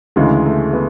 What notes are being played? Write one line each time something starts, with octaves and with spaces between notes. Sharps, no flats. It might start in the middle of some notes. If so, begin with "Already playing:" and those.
D2 C#3 E3 G#3
A3
B3